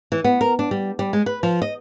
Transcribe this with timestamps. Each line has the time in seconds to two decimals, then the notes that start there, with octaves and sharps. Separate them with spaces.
0.12 E3
0.24 B3
0.41 A#4
0.59 D4
0.71 G3
0.99 G3
1.13 G#3
1.26 B4
1.43 F3
1.62 D#5